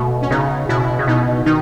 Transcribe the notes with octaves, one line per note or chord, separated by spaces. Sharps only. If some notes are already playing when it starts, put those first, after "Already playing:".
Already playing: B2 A3
C#4
C#3 B3 D#4
B2 C#4 E4
C#3
B2 B3 D#4
D#3 D#4